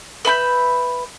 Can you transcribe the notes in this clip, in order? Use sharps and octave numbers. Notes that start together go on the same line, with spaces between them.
B4 E5 B5 G6